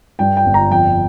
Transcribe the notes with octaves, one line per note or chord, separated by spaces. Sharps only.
G2 G5
G5
G1
A#5
F2 G5